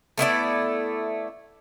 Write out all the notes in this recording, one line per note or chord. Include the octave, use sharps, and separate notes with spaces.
A3 B3 E4 D5